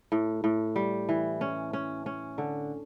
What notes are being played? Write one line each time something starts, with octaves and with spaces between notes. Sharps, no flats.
A2
A2
G3
E3
C#4
C#4
C#4
D3